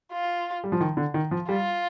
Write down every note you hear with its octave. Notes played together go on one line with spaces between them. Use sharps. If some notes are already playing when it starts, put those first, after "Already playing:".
F4
G3
F3
D#3
D3
D#3
F3
G3 F4